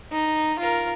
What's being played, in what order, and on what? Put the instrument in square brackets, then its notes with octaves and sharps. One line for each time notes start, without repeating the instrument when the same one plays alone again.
[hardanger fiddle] D#4
F4 A#4